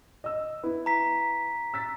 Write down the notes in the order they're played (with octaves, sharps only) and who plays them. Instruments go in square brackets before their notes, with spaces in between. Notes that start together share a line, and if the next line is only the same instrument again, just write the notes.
[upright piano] D#5 E6
B3 E4
[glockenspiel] A#5 B6
[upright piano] E6 A6 B6